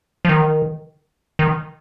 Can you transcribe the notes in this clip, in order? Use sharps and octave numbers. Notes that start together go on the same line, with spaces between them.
F3
D#3
D#3